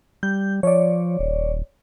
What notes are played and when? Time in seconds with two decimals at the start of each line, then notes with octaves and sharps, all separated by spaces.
0.23 G3 G6
0.63 F3 C#5 D5
1.19 D#1